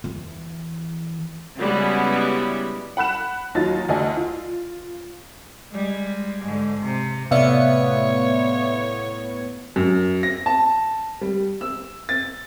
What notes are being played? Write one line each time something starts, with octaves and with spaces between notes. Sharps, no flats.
E2 E3
C#3 G3 G#3 B3 E4 F#4
F#5 B5 F#6 E7
D#2 F#3 D#4 F4 A6
D2 D5 D#5 G#5
F4
G3 G#3
G#2 D3
C3
A2 C3 B3 C#5 D5 E5 F5 C#7
F#2
A#6
A5
G3
E6
A6